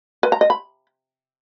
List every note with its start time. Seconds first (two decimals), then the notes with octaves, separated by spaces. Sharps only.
0.23 B4
0.32 A#5
0.41 D#5
0.50 B5